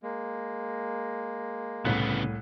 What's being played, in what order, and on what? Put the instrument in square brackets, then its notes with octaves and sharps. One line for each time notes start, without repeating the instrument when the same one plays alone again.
[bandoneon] G#3 A#3
[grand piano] C2 A2 F#6 [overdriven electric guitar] C#3 B3